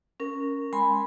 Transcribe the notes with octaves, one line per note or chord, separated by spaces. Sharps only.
C#4 A#4
G#3 G#5 B5 C6